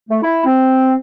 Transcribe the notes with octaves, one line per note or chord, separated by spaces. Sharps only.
A3
E4
C4